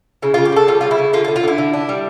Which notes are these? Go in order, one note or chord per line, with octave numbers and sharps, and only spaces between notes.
C#3 E4
C#3 F4
G4
C#3 A4
G3 F4
C#3 F4
E4
C#3
D3 F4
F4
D3
F4
D3 E4
D3
D4
G3